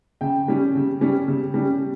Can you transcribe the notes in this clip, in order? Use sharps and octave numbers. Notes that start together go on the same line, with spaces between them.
C#3 G5
G3 C#4
C#3
G3 C#4
C#3
G3 C#4